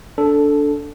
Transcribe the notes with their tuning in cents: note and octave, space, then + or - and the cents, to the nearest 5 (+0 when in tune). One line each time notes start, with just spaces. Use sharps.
D4 -15 A4 +0